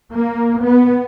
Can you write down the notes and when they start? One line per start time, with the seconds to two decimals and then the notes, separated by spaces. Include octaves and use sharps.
0.12 A#3
0.63 B3